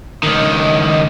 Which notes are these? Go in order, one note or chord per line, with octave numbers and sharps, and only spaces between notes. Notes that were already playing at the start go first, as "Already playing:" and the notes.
C#2 D#3